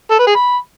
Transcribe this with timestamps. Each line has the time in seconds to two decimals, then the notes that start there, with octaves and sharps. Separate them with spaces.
0.11 A4
0.19 B4
0.27 G#4
0.35 B5